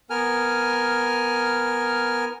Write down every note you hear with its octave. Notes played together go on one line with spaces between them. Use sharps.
B3 A#4 G#5 F6